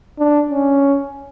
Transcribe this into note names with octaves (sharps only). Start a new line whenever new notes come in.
D4
C#4